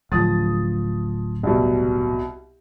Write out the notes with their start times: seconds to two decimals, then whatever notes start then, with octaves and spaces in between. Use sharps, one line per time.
0.12 D1 F3 D#6 A6
1.43 C2 B2